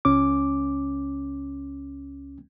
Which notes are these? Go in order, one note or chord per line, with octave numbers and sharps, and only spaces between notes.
C#2 C#4 D6